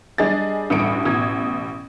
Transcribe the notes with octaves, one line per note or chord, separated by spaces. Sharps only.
G3 D4 G#4 D#5 A6
A1 D2 G2 C#7 D7
A1 B2 G#6